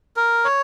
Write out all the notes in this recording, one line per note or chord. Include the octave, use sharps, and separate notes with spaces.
A#4
C#5